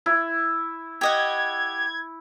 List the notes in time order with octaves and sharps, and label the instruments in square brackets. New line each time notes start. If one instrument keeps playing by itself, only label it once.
[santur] E4
[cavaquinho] G4 D#5 F#5 [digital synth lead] G#6